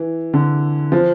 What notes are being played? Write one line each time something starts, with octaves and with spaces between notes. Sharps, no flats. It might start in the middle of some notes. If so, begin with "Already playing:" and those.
Already playing: E3
D3
F3